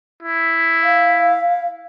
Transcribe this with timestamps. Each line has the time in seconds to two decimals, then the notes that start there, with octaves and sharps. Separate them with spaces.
0.23 E4
0.83 F5